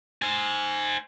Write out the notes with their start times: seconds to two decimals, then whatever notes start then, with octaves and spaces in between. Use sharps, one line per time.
0.22 C5 G#5